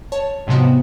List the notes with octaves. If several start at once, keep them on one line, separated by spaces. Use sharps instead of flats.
C#5 A5
G#2 C3 F3 B3 F#4